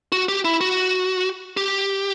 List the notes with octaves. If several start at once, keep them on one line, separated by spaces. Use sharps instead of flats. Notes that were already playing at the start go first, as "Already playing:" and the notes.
F#4
G4
E4
F#4
G4